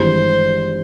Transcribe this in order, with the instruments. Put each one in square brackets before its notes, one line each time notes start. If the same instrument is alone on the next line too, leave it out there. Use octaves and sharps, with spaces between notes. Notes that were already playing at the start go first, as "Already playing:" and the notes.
Already playing: [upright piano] G#1 G2 E3 G#3 [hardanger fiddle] C5